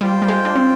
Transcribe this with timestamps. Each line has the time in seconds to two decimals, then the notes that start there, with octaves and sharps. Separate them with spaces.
0.01 G3 F4 C5 G5
0.22 G3
0.28 G#3
0.45 D4
0.55 C4